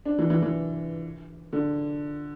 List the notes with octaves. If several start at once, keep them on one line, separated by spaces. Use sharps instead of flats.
D4
E3
E3
E3
D3